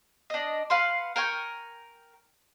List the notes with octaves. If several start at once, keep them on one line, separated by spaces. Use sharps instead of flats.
D4 D#5
B4 F5 F#5 C6
A#4 G5 G#5 C#6